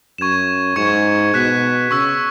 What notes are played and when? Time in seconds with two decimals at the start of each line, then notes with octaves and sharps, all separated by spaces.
0.18 F#2 C#6 G#6 E7
0.76 G#2 C#6 G#6 C#7 E7
1.34 B2 F#6 B6 E7
1.91 C#3 C#6 E6 B6